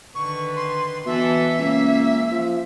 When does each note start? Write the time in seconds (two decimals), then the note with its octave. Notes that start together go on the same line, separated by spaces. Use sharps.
0.15 D3 D#3 B4 C#6
0.56 C6
1.06 B2 E3 A4 E5
1.58 C#2 A#3 C#4
2.31 F3